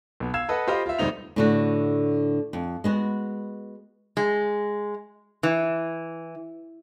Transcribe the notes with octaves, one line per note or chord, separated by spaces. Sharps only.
B1 B3
F5 E6 G#6 E7
A4 B4 D#5 F#5
F4 G4 C5 D#5 F5 B5
F4 E5
E1 G2 D3 C4 D#4 F7
A2 D3 F#4
F2
G#3 B3 F#4
G#3
E3